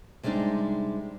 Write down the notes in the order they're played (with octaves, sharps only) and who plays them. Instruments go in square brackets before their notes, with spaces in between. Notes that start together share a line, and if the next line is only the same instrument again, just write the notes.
[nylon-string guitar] C3 G3 G#3 D4 D#4